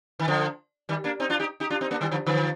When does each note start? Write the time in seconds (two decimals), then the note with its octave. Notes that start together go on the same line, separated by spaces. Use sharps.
0.20 D#3
0.28 D3 F3
0.89 D#3 G3
1.04 A#3 D4
1.20 C4 D#4
1.30 D4 F4
1.40 D#4 G4
1.60 D#4 G4
1.70 D4 F4
1.81 C4 D#4
1.91 A#3 D4
2.01 D#3 G3
2.11 D3 F3
2.27 D3 F3